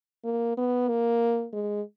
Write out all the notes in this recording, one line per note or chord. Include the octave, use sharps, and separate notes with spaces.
A#3
B3
A#3
G#3